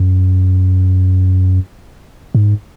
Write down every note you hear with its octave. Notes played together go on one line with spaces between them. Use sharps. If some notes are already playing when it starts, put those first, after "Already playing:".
Already playing: F#2
G#2